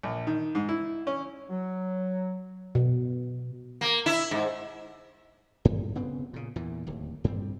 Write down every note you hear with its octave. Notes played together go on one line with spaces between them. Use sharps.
A#1
D#3
G#2
E4
C#4
F#3
B2
A#3
E4
G#2
G2
C#3 B3 C4
A#2 C#3
E2 A#2 E3
D1 D#2
G2 G3 C4